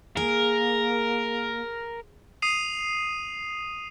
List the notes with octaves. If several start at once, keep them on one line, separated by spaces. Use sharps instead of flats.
A#3 G#4 A#4
D#6 C7 D#7 F7